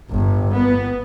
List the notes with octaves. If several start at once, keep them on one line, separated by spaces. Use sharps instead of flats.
G1
B3